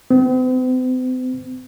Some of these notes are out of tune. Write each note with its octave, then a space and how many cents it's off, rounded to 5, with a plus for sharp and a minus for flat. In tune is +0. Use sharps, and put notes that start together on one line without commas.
C4 -45